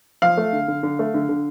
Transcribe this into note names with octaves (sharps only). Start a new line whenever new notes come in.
F3 F5
A3
D3
D3
D3
A3
D3
D3